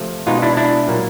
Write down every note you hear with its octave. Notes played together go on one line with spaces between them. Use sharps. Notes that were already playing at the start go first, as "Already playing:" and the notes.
Already playing: C3 F3 A3
B2 G#3 B3 D#4 F4
D4 E4
D4 E4
A#2 F#3 A#3